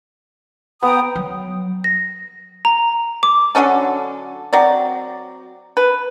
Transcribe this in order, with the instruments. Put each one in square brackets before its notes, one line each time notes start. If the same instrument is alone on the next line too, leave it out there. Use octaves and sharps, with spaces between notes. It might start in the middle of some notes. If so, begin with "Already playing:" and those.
[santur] B3 [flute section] G5 A#5 D#6
[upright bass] F#3
[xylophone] A#6
A#5
D6
[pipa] D3 F#3 C#4 A4
F#3 C4 D5
B4